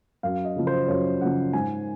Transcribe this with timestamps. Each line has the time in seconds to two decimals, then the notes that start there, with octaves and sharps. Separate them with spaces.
0.23 F#2 F5
0.45 D#5
0.56 C#3 F3
0.67 C5
0.88 F#2 C#5
1.21 C#3 F3 F#5
1.53 G#2 G#5